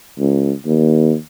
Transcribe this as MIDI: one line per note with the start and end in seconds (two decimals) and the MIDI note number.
0.19 0.52 37
0.66 1.15 39